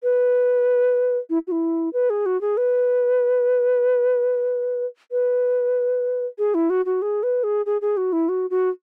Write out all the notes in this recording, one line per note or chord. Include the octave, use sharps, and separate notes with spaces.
B4
E4
F#4
E4
B4
G#4
F#4
G#4
B4
B4
G#4
E4
F#4
F#4
G#4
B4
G#4
G#4
G#4
F#4
E4
F#4
F#4